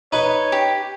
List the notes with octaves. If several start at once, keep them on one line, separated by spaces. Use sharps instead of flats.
D#4 B4 C#5
G4